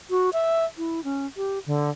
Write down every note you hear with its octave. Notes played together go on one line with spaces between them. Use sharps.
F#4
E5
E4
C#4
G4
D3